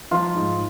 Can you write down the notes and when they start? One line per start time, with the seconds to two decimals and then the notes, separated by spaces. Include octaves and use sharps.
0.11 F3 F4
0.35 G#2